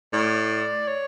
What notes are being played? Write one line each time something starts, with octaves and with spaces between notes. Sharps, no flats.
A2 D5
C#5